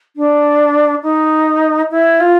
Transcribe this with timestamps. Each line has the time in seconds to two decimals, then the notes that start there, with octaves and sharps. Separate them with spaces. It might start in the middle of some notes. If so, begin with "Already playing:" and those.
0.16 D4
1.03 D#4
1.91 E4
2.20 F4